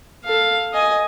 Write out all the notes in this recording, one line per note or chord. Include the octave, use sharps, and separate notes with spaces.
A4 F5
D#5 G#5